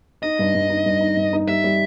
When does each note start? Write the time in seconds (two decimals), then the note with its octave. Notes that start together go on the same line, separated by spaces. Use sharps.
0.23 D#4 D#5
0.39 G2
0.55 G2
0.70 D#4
0.86 G2
1.00 D#4
1.17 G2
1.33 D#4
1.48 G3 E5
1.64 G3